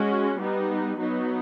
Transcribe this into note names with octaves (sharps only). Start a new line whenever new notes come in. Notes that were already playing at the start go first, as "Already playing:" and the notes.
Already playing: G#3 C#4 F#4
G3 B3 D#4
F#3 B3 D#4